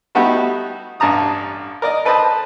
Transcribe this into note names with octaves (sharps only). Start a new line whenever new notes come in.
G3 A3 B3 D#4 F#4 G4
A1 G2 A5 A#5 D#6
A#4 D5 D#5
A4 B4 C5 D#5 A5 D#6